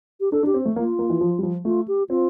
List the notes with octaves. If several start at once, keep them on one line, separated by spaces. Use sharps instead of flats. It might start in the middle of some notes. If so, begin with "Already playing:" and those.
G4
D4 A4
D4
G4
C4
A3
A#3 F4
A#3
E3
F3
G3
F3
A3 F4
G4
C4 F4